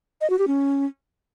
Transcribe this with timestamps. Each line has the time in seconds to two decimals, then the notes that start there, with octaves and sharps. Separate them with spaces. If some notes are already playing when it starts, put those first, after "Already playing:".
0.21 D#5
0.30 F#4
0.39 G4
0.47 C#4